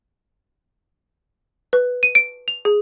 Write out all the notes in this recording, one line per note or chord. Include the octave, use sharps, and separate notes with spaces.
B4
D#7
D7
F7
G#4